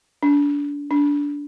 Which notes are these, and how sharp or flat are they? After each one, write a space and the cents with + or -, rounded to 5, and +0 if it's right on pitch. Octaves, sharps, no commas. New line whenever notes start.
D4 -30
D4 -20